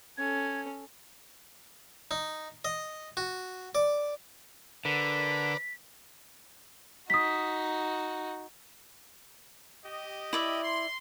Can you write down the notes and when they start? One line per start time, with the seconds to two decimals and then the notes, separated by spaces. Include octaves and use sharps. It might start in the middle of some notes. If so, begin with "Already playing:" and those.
0.18 C#4 A4 G#6
2.11 D#4
2.65 D#5
3.17 F#4
3.75 D5
4.85 D3 A#4 B4 D5 B6
7.10 D#4 F#4 D#6 B6
9.85 G4 D#5
10.33 E4 D5 E5
10.63 C6